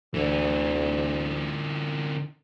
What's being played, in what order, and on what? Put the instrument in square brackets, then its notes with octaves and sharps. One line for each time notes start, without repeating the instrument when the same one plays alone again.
[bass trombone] D2 [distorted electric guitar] D3 E3